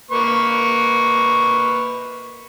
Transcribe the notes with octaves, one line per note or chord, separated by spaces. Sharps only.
A#3 B4 C#6